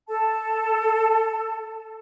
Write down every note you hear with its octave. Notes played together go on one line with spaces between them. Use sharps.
A4 A5